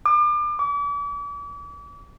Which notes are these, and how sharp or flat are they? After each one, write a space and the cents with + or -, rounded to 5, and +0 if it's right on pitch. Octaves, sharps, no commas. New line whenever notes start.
D6 +40
D6 -40